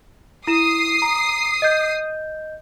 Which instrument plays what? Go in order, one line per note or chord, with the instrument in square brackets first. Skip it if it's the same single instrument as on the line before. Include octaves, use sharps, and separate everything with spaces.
[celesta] E4 D#7 E7 [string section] D#6 C7
[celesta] A#5
D#5 G6